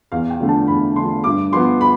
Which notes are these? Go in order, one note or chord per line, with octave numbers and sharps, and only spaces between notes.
E2 F5
G5
D3 F3 A3
A5
E2 B5
D3 F3 A3 C6
G2 D6
F3 B3 C6
B5